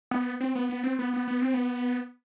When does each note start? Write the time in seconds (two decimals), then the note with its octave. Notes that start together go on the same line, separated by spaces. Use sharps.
0.11 B3
0.40 C4
0.55 B3
0.69 B3
0.84 C4
0.99 B3
1.13 B3
1.28 B3
1.42 C4
1.54 B3